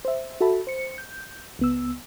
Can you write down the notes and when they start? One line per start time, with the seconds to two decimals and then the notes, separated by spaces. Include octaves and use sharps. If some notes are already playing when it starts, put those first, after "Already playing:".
0.05 C5 E5
0.41 F#4 A4 E5 A5 B5
0.67 C5 C#7
0.98 G6
1.59 C#2 B3 E6